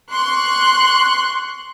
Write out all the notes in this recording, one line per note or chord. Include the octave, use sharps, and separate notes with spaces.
C6 C#6 F#6